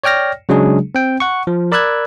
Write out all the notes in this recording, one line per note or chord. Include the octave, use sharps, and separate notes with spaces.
C#5 D5 G5 F6 A#6
C#3 F#3 G#3 D4 G#4
C4 G5
F#5 C#6
F3
A#4 D5 B5 E6 F#6 G#6